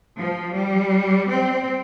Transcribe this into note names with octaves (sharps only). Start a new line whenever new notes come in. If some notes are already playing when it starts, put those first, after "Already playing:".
F3
G3
C4